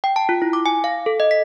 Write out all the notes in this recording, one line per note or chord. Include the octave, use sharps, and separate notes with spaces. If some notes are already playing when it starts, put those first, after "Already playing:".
G5
A5
F4
E4
D6
G#5
F5
A4
D#5
B6